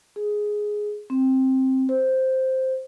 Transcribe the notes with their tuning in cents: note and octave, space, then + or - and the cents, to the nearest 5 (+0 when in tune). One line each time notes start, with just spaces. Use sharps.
G#4 +5
C4 +10
C5 +0